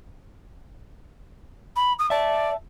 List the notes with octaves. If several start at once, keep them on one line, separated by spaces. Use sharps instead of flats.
B5
D#6
D5 E5 A5